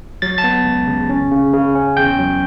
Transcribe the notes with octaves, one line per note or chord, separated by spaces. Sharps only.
F#3 A6
A5 A6
B3
C#2
C#3
C#4
C#3
C#3
C#4
E2 G5 G6
F#3